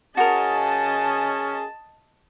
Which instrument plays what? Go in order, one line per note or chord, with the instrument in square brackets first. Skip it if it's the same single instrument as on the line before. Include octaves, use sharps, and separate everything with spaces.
[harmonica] C#4 G#4 [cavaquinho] F#4 A#4 [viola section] D#5 A5